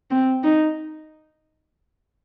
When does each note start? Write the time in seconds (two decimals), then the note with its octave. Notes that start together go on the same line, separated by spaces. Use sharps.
0.11 C4
0.44 D#4